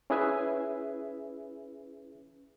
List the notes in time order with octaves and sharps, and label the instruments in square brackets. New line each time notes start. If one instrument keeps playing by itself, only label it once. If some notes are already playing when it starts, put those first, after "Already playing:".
[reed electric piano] C#4 E4 G#4 B4 E5 G#5